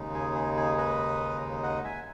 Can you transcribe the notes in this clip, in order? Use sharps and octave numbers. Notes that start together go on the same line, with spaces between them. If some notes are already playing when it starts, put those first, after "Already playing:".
Already playing: D#2 C#3 G#3 D#4
G#4
G#4
G#4
B4 D#5
D#5 F#5
E5 G#5